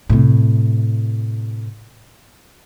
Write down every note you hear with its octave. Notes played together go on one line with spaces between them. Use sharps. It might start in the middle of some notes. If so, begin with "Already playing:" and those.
A2 C3